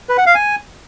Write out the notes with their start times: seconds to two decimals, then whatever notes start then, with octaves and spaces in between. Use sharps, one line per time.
0.09 B4
0.18 F#5
0.26 F5
0.35 G#5